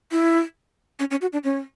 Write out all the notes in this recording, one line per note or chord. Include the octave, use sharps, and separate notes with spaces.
E4
C#4
C#4
F#4
D4
C#4